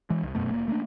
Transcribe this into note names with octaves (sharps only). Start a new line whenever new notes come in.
E3 G#3
C2
F1 F#2 B2 A3
F1 A#3
A3 A#3 C#4 D4